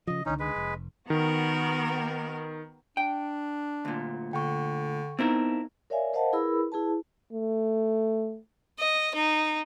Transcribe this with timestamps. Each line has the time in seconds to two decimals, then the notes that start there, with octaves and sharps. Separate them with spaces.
0.07 C#3 F3 D#5
0.26 C#2 D3 D#3 C#4 D#4
0.40 G#3 B4
0.56 F1
1.10 D#3 B3 F#4 A#4
2.97 D4 G5
3.85 D2 A#2
4.33 D3 G5 C#6
5.19 B3 C4 D#4 E4 A#4
5.90 A#4 C#5 D5 E5 F5 G#5
6.13 A#4 C5 D#5 F5 F#5 A5
6.33 E4 G#4 A#4 B4 B5 E6
6.72 E4 G#4 B4 A5
7.33 A3
8.79 D#5
9.15 D#4